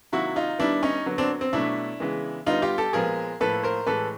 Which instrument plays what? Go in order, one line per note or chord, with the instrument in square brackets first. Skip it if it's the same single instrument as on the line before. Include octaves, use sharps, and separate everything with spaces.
[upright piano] C3 D#3 F#3 A#3 E4 F#4
D#4 F4
D#3 G3 B3 D4 E4
C#4 D#4
D3 F#3 B3
C4 D4
C4
B2 F#3 A3 D4 E4
C#3 E3 G#3 B3
D3 G3 B3 D#4 F4
F4 G4
G4 A4
A#2 F3 G#3 B3 G#4 A#4
A2 F3 A#3 A4 B4
A#4 C5
A2 E3 G#3 A4 B4